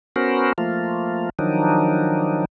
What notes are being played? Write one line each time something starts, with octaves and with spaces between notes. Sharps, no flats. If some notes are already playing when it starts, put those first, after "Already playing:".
B3 C#4 F#4 A#4 C5
F3 A3 A#3 F4
D#3 F3 F#3 D4 D#4